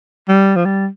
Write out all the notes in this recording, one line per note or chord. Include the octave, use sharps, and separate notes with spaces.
G3
F3
G3